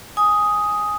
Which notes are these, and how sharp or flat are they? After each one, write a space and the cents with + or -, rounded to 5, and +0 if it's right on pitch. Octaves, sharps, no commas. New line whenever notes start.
G#5 +0 D#6 +5